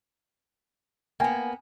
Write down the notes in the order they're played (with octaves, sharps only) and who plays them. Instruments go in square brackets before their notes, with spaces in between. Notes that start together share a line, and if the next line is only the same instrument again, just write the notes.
[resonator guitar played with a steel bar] A#3 B3 [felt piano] G5 G#5